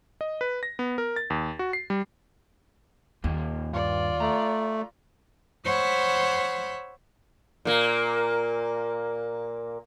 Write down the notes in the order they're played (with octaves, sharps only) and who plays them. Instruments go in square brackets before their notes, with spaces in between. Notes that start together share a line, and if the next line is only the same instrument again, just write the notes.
[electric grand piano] D#5
B4
A#6
B3
A#4
A6
D#2
F#4
C7
G3
[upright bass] D#2 [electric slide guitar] D#3 A#3 F4
[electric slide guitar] G2 [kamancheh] F4 D5
[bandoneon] A3 [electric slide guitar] A#5
[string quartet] C5 C#5 E5 F#5 B5
[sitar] A#2 A#3